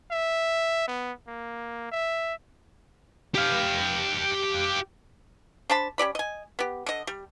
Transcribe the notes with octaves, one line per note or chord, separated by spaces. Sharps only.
E5
B3
A#3
E5
G4 F5
D4 C5 A5 B5
C#4 G4 D5 B5
D#5 G#5
B3 G4
D3 D#5
G3